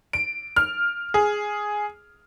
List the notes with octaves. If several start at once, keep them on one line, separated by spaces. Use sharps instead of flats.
D7
F6
G#4